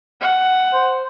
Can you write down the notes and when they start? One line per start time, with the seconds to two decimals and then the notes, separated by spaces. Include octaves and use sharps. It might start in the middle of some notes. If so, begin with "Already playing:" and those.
0.21 F#5
0.73 C5